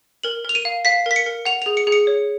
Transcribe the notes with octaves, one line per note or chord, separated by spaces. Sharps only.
A#4 F#7
A#4 F7
D#7
F5
F5 B6
A#4 B6
C#7
A#4
F#5 F7
G#4 F7
C#7
G#4
C#7
C#5